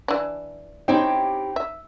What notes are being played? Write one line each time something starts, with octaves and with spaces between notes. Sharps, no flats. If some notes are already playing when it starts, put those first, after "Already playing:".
E3 D4
C4 C#4 D#4 E4 G4 G5
E5